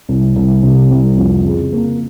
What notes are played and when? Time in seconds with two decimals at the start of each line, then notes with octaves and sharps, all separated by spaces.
0.09 C2
0.36 C2
0.63 C3
0.91 C2
1.17 F2
1.45 C#3
1.72 A#3